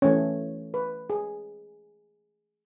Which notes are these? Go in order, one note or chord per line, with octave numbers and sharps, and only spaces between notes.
E3 A3 C#4 C#5
B4
G#4